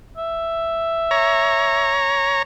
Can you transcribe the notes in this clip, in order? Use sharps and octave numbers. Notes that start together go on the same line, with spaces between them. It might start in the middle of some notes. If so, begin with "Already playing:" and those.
E5
C#5 A#5